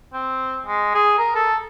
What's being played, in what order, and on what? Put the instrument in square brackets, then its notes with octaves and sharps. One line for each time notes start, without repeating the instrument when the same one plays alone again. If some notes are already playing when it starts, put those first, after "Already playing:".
[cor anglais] C4
G#3
G#4
A#4
A4